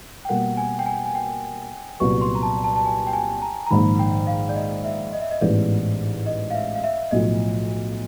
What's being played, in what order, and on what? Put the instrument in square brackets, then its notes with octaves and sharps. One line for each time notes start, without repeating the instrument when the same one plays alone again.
[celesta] G5
[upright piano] B2 G3 A#3 [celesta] F#5
[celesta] G#5
G5
G#5
G#5
G5
[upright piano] C2 A#2 F#3 B3 [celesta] C#6
[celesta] C6
A#5
A5
A5
A5
G#5
G5
G#5
A#5
A#5
[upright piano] A#1 G#2 D#3 G#3 [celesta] B5
[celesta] G5
F5
D5
D#5
E5
D#5
E5
D#5
[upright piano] A1 G#2 E3 G#3 B3 [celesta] D5
[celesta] D#5
F5
E5
F5
E5
[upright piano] B1 A2 F3 [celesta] D#5